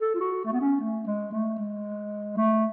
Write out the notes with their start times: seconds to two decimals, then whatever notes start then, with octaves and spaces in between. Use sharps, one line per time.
0.02 A4
0.15 F4
0.21 F#4
0.45 A3
0.53 B3
0.61 C#4
0.81 A3
1.07 G#3
1.33 A3
1.59 G#3
2.37 A3